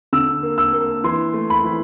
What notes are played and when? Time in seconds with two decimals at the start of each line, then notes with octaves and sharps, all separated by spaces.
0.13 D3 E6
0.43 A#3
0.58 E6
0.73 A#3
1.04 E3 C6
1.34 A3
1.50 B5
1.64 E3